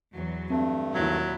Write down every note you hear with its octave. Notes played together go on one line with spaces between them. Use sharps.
E2 F#3
G2 A3 C4
D#2 A#2 F#3 E4